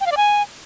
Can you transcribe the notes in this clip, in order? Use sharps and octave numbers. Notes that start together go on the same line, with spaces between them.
G5
F5
D5
G#5